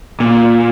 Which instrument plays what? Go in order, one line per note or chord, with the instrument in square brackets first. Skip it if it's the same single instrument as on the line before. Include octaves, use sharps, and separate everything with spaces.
[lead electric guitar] A#2